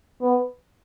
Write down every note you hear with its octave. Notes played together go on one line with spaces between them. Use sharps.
B3